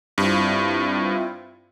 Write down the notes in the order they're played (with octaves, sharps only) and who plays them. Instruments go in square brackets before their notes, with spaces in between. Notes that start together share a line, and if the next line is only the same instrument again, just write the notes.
[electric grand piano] G2 [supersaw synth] C4 E4 F4